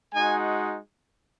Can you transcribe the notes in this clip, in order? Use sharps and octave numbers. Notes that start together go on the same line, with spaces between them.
G#3 D#4 F#4 G#5